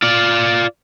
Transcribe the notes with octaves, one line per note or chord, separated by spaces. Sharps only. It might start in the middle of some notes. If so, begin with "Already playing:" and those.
F4 D5